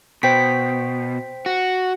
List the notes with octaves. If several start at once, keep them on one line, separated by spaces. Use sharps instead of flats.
B2 C5 G5 B6
F#4